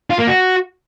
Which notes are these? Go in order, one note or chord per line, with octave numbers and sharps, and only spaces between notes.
F4
A#3
F#4